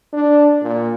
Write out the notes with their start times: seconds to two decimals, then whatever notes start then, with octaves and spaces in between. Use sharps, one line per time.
0.13 D4
0.62 A#2